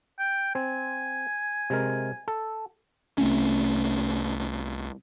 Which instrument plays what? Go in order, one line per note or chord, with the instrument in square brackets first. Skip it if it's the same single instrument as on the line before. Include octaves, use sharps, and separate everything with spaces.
[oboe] G5
[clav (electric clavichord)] C4 [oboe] G#5
[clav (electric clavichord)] C3 G#3 A#4
A4
[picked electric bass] C2 A3 C4 C#4